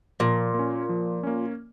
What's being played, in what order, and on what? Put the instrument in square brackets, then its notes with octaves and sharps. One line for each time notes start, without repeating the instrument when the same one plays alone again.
[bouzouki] A#2 [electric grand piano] F3
[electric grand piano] A#3
C#4
F3
A#3 C#4